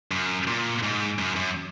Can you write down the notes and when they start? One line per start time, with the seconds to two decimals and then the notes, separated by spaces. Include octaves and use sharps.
0.11 F#2
0.48 A#2
0.83 G#2
1.19 F#2
1.36 F#2